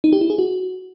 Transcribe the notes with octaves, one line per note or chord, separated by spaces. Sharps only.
D#4
G4
E4
G#4
F#4